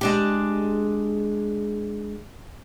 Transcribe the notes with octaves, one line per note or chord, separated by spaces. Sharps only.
G#3 D4 G4